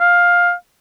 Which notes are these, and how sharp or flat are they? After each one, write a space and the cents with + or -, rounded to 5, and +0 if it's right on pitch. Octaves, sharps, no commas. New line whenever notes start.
F5 +10